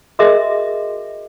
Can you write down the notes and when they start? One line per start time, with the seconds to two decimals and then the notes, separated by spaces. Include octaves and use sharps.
0.19 F#4 G#4 A#4 D#5 E5